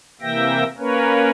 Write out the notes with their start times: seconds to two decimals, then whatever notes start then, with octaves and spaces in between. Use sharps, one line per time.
0.21 C3 E3 A#3 E5 G5 A#6
0.78 A#3 C#4 A#4 B4 C#5